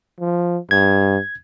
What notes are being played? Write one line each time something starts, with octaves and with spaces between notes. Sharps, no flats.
F3
G2 G#6